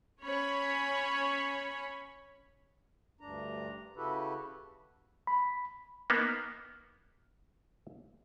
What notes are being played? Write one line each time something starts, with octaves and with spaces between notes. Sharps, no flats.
C#4 C#5 B5
D2 G2 D4 A#5
C#3 E4 F#4 G4 A4 B4
B5
A#3 B3 D#4